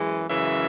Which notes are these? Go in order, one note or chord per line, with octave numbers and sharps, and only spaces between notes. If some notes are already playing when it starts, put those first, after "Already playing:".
Already playing: F#2 E3 G#3
F#2 C#3 E3 G#3 E5